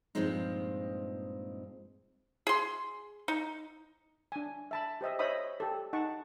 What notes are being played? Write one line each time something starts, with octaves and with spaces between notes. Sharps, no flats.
G2 A#2 F3 G#3 C4 D#4
G#4 C6
D#4
D4 G#5
E5 A5 B5
G4 C5 D#5 E5
C5 C#5 D#5 E5 B5 D#6
G4 A4
D#4 F#5 A5 C#6